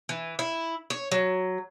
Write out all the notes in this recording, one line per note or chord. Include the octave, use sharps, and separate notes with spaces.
E3
E4
C#5
F#3